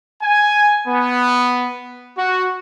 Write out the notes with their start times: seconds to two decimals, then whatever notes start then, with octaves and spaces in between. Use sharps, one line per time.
0.23 G#5
0.88 B3
2.17 F#4